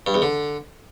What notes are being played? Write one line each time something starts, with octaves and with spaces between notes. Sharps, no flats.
G2
E2
D3